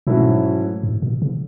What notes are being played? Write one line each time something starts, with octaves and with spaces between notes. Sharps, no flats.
G#2 B2 F#3 A3 C#4 E4
G#2
B2
C#3